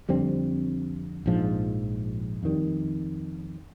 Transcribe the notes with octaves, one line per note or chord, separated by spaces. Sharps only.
F2 D3 G3 C4
A#1 G#2 F3
F2 D#3 G3